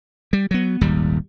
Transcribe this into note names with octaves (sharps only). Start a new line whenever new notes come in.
G3
F#3 B3
D#1 G#1 D#2 G3